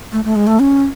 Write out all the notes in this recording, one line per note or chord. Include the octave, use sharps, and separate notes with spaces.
A3
A3
G#3
A3
C#4